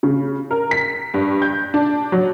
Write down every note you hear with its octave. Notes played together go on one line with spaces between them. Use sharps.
C#3
A#4
B6
G2
G6
D4
F#3